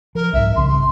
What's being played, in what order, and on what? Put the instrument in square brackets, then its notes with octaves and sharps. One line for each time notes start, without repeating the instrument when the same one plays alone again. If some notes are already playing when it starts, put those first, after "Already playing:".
[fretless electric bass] F3 [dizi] A#4
[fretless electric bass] C2 G#2 [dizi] E5
[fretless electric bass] C2 F#2 C#3 [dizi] C6